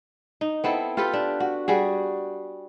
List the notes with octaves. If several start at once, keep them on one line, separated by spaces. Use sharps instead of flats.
D#4
B3 C4 E4 A4
F4 G4 A4 B4
D4
F#4
G3 F#4 G#4